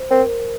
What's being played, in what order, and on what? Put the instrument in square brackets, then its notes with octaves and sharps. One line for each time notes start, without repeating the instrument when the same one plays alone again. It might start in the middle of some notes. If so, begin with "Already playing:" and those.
Already playing: [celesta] C5
[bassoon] C4 [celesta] A#4